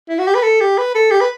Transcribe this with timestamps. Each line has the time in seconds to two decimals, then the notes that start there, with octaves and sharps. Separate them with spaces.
0.09 E4
0.19 F#4
0.27 G4
0.34 B4
0.43 A4
0.61 G4
0.78 B4
0.95 A4
1.11 G4
1.20 B4